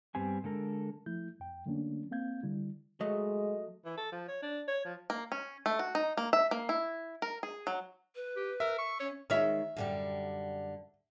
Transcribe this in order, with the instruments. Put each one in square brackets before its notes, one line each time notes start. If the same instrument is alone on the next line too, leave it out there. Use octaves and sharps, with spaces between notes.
[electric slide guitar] G2 G3 B3 C4 G#5
D3 G#3 A4 A#4
[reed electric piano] F3 A3 E4 G6
F2 G5
D3 F#3 A3 A#3 C#4 D4
A#3 C4 F5 G6 G#6
D3 G3 E4
[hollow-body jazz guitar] F#3 A3 [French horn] G#3 [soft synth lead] D#5
[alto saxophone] E3
A4
F3
C#5
D4
C#5
F3
[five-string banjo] A#3
C#4
A3
F#4
D#4
A#3
E5
A#3
E4
A#4
G#4
F#3
[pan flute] B4
[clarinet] G4
[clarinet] A#4 [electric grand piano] E5
[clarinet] C#6
[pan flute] C#4 [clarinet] C#5
[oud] D#3 G#3 C#5 [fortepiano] E5 F6
[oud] F#2 D3 G3